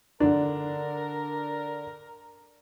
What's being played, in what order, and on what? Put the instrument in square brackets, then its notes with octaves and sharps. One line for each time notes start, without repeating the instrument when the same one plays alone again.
[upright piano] D3 D4 [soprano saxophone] A#4